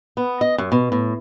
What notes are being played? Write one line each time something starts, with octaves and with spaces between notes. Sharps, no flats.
B3
D#5
F#2
B2
A2